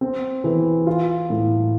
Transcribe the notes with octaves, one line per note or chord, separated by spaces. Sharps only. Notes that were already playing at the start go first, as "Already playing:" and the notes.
C4
E3
F4
A2